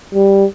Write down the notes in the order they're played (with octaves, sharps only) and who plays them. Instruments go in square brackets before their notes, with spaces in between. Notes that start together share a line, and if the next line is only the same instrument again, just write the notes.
[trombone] G3